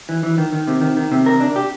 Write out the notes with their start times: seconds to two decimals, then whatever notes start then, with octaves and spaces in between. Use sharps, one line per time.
0.09 E3
0.23 E3
0.38 D#3
0.52 D#3
0.67 C3
0.81 D#3
0.97 D#3
1.12 C3
1.26 A#4
1.40 D4
1.56 G4